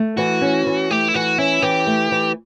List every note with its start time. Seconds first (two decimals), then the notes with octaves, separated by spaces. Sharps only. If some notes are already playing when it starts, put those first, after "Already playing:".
Already playing: A3
0.17 E3 F#4
0.41 C#4
0.67 E3
0.91 A3 G4
1.08 E4
1.14 E3 F#4
1.38 C#4 E4
1.62 E3 G4
1.87 A3
2.12 E3